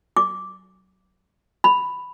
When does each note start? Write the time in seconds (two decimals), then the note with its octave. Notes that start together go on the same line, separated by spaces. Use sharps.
0.17 D6
1.64 B5